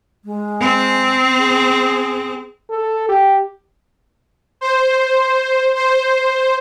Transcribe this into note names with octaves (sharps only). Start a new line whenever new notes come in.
G#3
C4
G#4
A4
G4
C5
C5